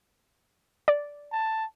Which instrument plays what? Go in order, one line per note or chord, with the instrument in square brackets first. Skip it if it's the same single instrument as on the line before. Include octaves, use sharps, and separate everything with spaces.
[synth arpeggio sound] D5
[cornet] A5